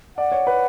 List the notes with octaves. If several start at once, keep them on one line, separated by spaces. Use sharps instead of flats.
D5 F#5
C#5
B4